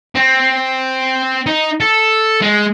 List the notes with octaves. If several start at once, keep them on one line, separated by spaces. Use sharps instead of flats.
C4
D#4
A4
G#3